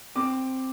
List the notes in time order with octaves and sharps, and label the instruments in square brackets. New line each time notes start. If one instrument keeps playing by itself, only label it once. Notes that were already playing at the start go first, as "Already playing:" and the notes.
[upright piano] C4 D6